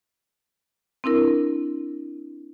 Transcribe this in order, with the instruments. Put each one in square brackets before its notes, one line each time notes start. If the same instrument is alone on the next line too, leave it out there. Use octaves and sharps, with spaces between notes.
[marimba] C4 D4 E4 A#4